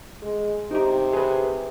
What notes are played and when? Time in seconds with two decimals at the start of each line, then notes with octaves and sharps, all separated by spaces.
0.22 G#3
0.71 C3 D#4 G4
1.13 G#4 B4